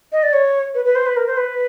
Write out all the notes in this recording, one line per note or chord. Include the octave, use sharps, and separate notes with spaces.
D#5
D5
C#5
B4
B4
C5
B4
A#4
C5
B4